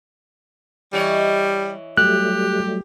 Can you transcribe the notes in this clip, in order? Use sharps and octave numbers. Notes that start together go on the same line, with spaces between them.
E3 G3 C#5 D#5
F#3 G3 A3 G4 F#6